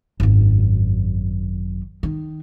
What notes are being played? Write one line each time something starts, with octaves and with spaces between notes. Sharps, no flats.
G#1 F#2
D#3